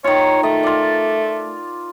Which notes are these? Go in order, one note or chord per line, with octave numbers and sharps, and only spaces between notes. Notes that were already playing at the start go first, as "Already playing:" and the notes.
D#3 F4 C#5
A3 D#5
F4 D5